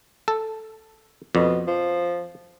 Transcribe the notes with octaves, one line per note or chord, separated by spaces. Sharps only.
A4
F2 B2
F3